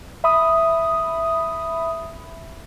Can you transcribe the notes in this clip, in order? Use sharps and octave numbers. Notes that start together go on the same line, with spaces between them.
E5 B5 D#6